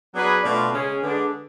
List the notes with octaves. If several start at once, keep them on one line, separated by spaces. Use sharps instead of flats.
F#3 B3 D4 G#4 B4
B2 A3 D4 F4
C#3 G#3 C#4 G#4
D3 G#3 B3 D4